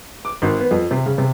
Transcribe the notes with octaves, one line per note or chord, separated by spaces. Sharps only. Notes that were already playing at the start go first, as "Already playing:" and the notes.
D6
G#1
B3
F2
C3
C#3
C3